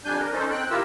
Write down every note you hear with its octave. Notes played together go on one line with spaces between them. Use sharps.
F2 G3 D4 G#5 G6
A#4
C#4 D#4 A4 C5
C4 G5 F#6
E4 F4 G4 A#4 E6